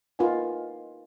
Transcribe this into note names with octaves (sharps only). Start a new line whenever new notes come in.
D#4 F4 A#4 B4 F#5 G#5